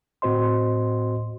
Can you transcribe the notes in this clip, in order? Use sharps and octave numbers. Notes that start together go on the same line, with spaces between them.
A2 C4 F#4 C5 D#5 C6